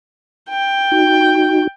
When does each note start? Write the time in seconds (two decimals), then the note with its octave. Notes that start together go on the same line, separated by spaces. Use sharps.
0.50 G5
0.91 D#4 F#4